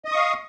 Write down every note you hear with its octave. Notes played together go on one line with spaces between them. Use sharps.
D#5 F5 C#6 D#6